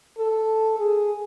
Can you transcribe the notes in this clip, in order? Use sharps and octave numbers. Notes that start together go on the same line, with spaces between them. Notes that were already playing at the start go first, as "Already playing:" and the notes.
A4
G#4